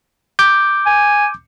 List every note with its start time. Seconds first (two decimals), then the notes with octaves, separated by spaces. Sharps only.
0.39 D6 G6
0.86 G#5